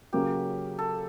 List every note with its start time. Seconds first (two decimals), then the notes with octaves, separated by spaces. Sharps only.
0.13 C#3 F#3 A#3 G4
0.79 A4